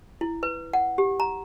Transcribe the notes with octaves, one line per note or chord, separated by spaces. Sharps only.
E4
B4
F#5
G4
A#5